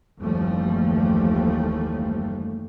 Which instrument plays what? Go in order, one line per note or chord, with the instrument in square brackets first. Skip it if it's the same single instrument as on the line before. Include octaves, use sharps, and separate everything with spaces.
[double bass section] F#1 D#2 E3 F3 G3 A3